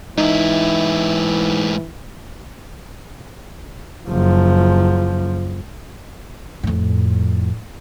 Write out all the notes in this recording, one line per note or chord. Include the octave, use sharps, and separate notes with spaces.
G#2 E3 D#4 E4
F#1 F3
F2 A2